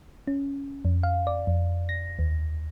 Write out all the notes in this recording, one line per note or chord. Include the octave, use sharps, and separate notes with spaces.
C#4
F2
F5
D5
F2
A#6
D#2